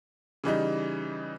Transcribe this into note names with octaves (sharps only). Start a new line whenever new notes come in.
C#3 E3 G3 D#4